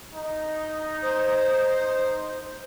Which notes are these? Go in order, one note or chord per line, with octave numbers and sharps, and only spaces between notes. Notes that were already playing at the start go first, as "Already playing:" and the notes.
D#4
C5